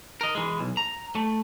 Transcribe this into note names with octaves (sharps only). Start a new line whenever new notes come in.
A#4 D#5
E3 G#3
B1
A#5
A3